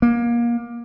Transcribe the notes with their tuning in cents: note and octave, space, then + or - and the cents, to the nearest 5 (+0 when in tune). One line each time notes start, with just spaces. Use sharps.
A#3 +25